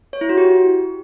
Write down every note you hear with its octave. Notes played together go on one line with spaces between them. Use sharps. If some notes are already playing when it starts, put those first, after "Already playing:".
C#5
E4
F#4
G4